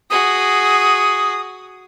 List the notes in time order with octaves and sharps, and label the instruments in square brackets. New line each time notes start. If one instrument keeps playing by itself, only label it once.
[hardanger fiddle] F#4 G#4 [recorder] D#6